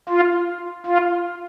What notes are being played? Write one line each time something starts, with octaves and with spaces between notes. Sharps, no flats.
F4
F4